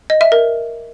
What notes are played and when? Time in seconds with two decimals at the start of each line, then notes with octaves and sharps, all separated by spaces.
0.10 D#5
0.21 E5
0.32 A#4